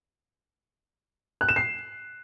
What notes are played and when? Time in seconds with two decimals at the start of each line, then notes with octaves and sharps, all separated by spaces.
1.41 F#6
1.49 E7
1.56 C7